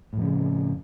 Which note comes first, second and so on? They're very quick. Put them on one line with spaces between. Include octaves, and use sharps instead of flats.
A2 F2 C#3